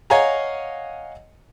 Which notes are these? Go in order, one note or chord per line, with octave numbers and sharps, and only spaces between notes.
C#5 D#5 F5 F#5 G#5 A#5